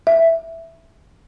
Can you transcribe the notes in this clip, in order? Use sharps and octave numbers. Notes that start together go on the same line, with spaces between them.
E5